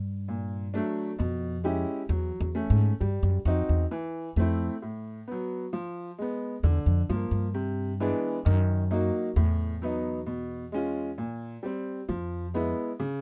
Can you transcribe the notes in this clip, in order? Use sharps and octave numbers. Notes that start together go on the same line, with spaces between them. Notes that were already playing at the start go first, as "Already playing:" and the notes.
Already playing: G2
A#2
F#3 A3 D4
F2 B2
G#3 C#4 E4 G4
E2 F#3
E2
A3 C#4
G#2
G2 G3
F#2
F2 C4 D#4 F#4
E2
E3
F2 A3 C4 E4
A2
F#3 B3
F3
G#3 B3
E2 D3
F2
G2 F3 A#3
G2
C3
E3 G#3 B3 D4
F#2 D#3
F#3 A#3 D#4 F#4
E2 A2
F#3 B3 D#4
B2
G#3 C#4 F4
A#2
G3 C4
F2 F3
G#3 B3 E4
C#3